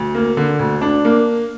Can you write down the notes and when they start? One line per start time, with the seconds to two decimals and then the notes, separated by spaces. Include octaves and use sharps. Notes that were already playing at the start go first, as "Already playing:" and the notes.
Already playing: D2
0.15 A#3
0.37 D3
0.59 D2
0.81 D4
1.05 A#3